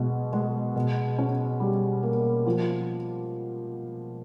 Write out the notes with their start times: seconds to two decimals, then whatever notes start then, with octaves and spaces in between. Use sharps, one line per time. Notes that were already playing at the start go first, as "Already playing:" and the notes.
Already playing: B2 G#3
0.33 G#3
0.76 B2
1.19 C#4
1.60 G3
2.03 A#3
2.46 F3